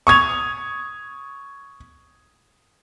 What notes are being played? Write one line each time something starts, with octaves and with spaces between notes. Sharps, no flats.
C#6 D#6 G#6 F7